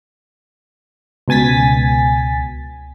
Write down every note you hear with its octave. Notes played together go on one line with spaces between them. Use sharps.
C#2 B2 G#5 A6 B6